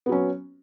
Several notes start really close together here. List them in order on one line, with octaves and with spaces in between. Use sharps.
B3 F#3 C#4